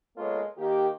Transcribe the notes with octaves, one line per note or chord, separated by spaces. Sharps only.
G#3 A#3 B3 F4 A4 C#5
D#3 A#3 G4